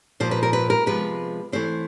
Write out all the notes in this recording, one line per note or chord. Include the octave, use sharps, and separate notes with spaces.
A#2 F3 A#3 C5
B4
A#4
B4
A#4
C3 F3 G#3 B3 B4
E3 A3 C4 C5